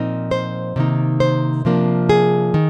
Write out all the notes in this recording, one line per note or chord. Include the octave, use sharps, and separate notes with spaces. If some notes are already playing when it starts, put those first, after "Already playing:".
Already playing: A#2 F3 C4 D#4
C5
C3 D#3 A#3 D#4
C5
C3 F3 A#3 D4
G#4
D#3